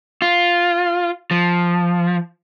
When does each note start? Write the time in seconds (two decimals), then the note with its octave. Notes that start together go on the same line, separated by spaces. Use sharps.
0.22 F4
1.31 F3